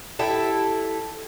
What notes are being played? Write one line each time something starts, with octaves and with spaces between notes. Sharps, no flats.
E4 G4 A4